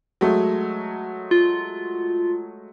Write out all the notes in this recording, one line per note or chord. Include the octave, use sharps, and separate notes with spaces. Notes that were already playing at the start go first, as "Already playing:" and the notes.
F#3 G#3 A3
F4